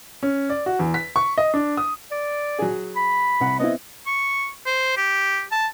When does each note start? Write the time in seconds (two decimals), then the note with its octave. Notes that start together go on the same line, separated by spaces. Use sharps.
0.23 C#4
0.50 D5
0.66 F#4
0.79 E2
0.94 B6
1.16 C#6
1.38 D#5
1.54 D4
1.77 D#6
2.11 D5
2.59 F#3 G#4
2.96 B5
3.40 C2 F#5
3.59 B3 C4 E4 D#5
4.07 C#6
4.66 C5
4.97 G4
5.52 A5